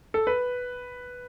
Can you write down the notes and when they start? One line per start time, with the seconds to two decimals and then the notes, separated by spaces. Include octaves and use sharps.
0.14 A4
0.27 B4